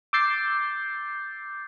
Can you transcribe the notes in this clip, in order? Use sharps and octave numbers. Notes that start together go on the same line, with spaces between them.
D6 E6 G6 A6 C7